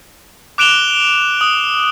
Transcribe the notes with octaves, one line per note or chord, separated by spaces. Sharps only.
D6 F#6 D7 E7 F7 G7
D#6